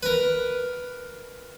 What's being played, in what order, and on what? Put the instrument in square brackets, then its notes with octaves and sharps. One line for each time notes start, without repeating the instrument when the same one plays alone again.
[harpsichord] A#4 B4